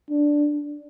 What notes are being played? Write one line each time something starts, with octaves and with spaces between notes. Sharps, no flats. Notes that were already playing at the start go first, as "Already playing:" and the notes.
D4